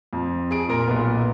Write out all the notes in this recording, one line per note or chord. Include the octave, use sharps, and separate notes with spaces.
F2
G#4 D7
A#2 A#4 D7
B1 A#2 B3